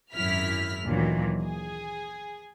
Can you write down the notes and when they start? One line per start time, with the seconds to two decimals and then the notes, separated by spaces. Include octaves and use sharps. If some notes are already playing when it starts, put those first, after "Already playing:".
0.14 G#1 F#2 E4 F6 B6
0.85 D2 A#2 D#3 E3 F#3
1.43 G#4